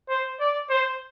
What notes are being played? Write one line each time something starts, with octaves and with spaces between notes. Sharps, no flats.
C5
D5
C5